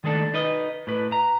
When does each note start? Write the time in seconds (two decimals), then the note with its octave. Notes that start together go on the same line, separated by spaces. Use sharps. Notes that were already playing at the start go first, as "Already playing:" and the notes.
0.04 D#3 G#3 A3 D4 A4
0.34 D#4 B4 D#5
0.87 A2 B4
1.12 A#5